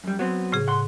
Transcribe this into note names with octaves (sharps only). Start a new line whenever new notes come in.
F#2 G3
F#3 B3 C4
A2 C#3 G#4
A2 F#5 C6